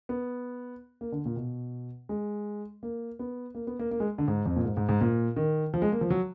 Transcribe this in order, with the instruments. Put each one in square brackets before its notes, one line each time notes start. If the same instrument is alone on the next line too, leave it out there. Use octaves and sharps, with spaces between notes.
[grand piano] B3
A#3
D3
A#2
B2
G#3
A#3
B3
A#3
B3
A#3
A#3
G#3
D3
G#2
F2
A#2
G#2
G#2
G#2
A#2
D#3
F3
G#3
A#3
F3
F#3